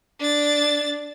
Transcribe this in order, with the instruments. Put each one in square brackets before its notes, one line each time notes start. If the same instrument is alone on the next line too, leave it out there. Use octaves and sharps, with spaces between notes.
[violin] D4 A6